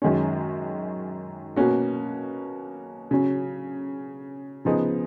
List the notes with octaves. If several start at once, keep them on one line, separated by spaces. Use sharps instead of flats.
F#2 D#3 G#3 C#4
B2 A#3 C#4 F#4
C#3 F#3 C#4
C#3 F3 B3 D#4 G#4